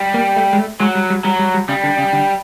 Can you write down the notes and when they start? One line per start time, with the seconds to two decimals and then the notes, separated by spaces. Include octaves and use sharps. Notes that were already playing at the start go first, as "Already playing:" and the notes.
Already playing: G3
0.14 A#3
0.36 A3
0.53 G#3
0.58 A3
0.80 F#3 G#3
0.95 G3
1.10 G3
1.24 F#3 G3
1.39 G3
1.54 G3
1.69 C#3 G3
1.84 D3
1.98 C#3
2.13 D3